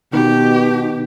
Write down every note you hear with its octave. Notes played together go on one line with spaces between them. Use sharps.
B2 D#3 B3 D#4 G4